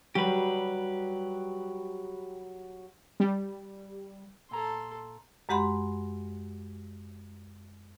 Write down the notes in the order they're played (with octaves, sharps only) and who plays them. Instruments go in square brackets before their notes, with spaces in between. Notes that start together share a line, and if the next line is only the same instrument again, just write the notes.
[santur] F#3 [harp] G3 [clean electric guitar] G4 B4
[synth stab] G3
[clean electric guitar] A#2 A#5 [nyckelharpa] A4 C6
[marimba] F#2 G#3 G4 F#5 B5 C6